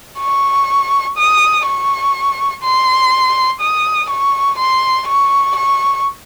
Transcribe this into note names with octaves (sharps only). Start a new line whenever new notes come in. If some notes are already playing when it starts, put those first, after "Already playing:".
C#6
D#6
C#6
C6
D#6
C#6
C6
C#6
C#6